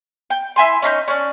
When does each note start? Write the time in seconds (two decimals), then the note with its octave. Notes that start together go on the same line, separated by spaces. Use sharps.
0.30 G5
0.56 E4 E5 G#5 C6
0.82 C#4 D#4 B5 G6
1.08 C#4 D4